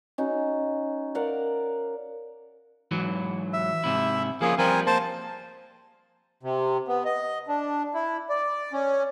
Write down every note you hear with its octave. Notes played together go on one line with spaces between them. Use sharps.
C#4 D#4 F#4
A#4 D5 F5 F#5
G#2 E3 F#3
E5
G#2 C3 E4
F3 A#3 C#4 F4 G#4
F3 G3 C4 F4 A#4 G#5
A#3 C5 A5
C3
B3
D#5
D4
E4
D5
C#4